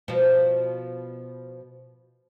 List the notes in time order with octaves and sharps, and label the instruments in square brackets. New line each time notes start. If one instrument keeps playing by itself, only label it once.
[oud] B2 F3